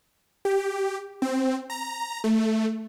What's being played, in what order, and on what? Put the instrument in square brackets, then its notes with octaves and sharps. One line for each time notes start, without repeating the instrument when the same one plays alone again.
[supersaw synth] G4
C4
A#5
A3